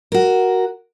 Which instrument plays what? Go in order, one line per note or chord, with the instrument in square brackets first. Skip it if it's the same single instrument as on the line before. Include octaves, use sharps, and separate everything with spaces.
[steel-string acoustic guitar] F#4 A#4